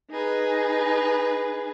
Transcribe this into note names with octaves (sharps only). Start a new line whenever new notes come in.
D#4 G#4 B4